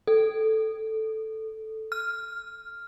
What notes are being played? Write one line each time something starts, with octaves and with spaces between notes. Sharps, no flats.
A4
F6